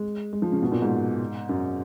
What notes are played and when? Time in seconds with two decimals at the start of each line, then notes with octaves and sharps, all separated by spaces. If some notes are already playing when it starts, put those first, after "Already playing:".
Already playing: G#3
0.33 G#3
0.42 F3
0.52 C#3
0.62 B2
0.72 A#2
0.82 G#2
1.49 F#2